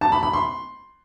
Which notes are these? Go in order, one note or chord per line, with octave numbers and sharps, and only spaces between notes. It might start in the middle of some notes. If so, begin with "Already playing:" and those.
A5
B5
B5
C6